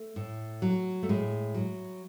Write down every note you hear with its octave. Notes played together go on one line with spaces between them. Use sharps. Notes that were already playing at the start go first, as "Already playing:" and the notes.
Already playing: A3
A2
F#3
A3
A2 G#3
F#3